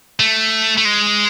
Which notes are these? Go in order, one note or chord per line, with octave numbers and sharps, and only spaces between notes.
A3
A3
G#3